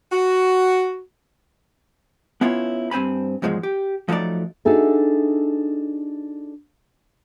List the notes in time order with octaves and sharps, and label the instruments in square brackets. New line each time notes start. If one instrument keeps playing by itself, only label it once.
[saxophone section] F#4
[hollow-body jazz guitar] B3 C#4 E4 F4 C#5
G2 C4 C5 G#5 B5
E2 G#2 F3 F#3 G#3
G4
F3 F#3 A3 D#4 D5
[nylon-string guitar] D4 D#4 F#4 G#4 A4 E5